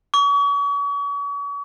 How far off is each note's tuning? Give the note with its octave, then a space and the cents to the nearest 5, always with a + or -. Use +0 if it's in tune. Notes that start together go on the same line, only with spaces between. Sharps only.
C#6 +40